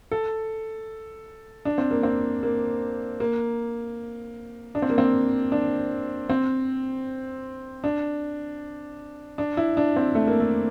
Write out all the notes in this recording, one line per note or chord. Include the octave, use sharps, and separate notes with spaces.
A4
D4
C4
A#3
C4
A#3
A#3
D4
C4
A#3
C4
D4
C4
D4
D4
E4
D4
C4
A3
A#3
A3